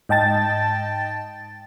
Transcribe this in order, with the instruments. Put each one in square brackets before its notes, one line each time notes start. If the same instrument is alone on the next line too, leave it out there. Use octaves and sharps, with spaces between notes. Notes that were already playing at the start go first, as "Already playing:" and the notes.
[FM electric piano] G#2 D#5 G5 A5 A6